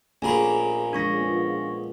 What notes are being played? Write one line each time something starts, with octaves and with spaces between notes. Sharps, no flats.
A#1 A3 C#4 G4 G#4 G#5 A#5 B5
F3 G#3 C#4 D4 C#6 A#6
B3 C#4 F4